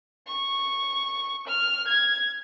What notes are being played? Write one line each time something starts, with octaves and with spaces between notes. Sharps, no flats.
C#6
F6
G#6